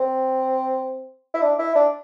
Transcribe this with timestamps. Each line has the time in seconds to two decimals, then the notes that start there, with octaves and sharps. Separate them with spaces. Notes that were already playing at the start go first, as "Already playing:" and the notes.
Already playing: C4
1.34 E4
1.42 D4
1.59 E4
1.75 D4